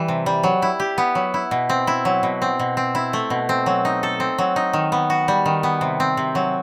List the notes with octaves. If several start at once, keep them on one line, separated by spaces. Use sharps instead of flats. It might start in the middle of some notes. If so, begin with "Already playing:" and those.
Already playing: E3 G3
C3
G3
F#3
E4
G4
B3
F#3
E4
B2
C4
E4
F#3
B2
C4
B2
C4
E4
A3
B2
C4
F#3
D#4
A4
C4
F#3
D#4
D#3
B3
F#4
G3
D#3
B3
C3
C4
C3
F#3